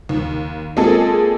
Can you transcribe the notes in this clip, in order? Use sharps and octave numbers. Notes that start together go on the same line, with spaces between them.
D#2
G#3 A#3 C4 F4 G#4 A4